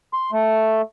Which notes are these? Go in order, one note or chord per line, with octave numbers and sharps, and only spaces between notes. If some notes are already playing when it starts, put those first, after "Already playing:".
C6
A3